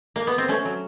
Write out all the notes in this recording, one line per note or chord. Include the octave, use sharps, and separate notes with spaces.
A#3
B3
C4
A3 C#4
F#3